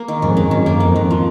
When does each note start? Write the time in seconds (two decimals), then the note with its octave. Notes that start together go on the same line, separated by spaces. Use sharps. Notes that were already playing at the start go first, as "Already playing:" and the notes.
Already playing: A#3
0.08 D#3
0.22 F2 G#2 C#4
0.37 D#3
0.51 F#2 D#3
0.66 A#3
0.80 F2 D#3
0.96 D#3
1.11 F3